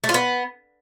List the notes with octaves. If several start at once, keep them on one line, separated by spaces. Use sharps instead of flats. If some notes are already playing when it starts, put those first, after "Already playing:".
A3
F4
B3